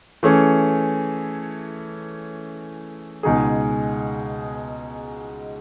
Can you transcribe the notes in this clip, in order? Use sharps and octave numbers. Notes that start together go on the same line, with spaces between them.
E3 A3 C#4 G#4
C#2 B2 G#3 D#4 G#4